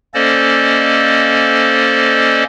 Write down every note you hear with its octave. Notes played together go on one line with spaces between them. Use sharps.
A#3 C#4 A4 C5 D5 D#5